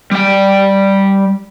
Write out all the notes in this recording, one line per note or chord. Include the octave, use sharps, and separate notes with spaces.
G3 G5